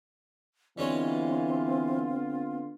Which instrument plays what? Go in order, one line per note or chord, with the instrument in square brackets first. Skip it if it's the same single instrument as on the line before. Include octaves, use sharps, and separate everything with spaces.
[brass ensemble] D3 B3 F4 [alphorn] E3 [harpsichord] G3 G#3 C#5 [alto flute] C4